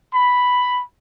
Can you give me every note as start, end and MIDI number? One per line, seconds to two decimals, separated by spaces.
0.13 0.83 83